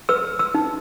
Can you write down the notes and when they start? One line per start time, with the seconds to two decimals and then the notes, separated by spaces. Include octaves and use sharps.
0.09 B4 E6
0.39 E6
0.55 D#4